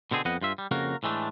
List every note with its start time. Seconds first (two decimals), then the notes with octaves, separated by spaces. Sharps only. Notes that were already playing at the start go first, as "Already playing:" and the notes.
0.11 B2 D3 C4 G#4
0.25 F2 B3 D#5 F#5
0.42 G2 F4 E5
0.58 G3
0.71 F2 C#3 A#3 F#4 A#4
1.03 A2 E3 G#3 A3 D4